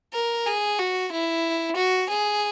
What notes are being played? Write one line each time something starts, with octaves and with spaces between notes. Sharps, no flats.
A#4
G#4
F#4
E4
F#4
G#4